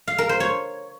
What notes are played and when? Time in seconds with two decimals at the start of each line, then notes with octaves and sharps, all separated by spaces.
0.07 F5
0.18 A#4
0.29 C5
0.40 C#5